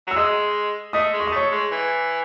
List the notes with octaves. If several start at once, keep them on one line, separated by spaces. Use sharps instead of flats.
F#3 E6
G#3 D#5 D#6
A3 D#5 D#6
G#3
C#6
D#6
A3 C#5 C#6
G#3
E3